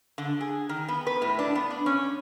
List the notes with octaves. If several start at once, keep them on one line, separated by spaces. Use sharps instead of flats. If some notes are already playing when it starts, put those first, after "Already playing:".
D3
G#4
D#3
B3
B4
A2
D4
B3
D4
C#4